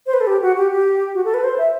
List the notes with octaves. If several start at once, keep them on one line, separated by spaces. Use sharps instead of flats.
C5
B4
A4
G4
F#4
G4
G4
F#4
A4
B4
C5
E5